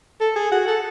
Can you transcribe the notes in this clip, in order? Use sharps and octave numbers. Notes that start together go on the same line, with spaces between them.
A4
G#4
F#4
A4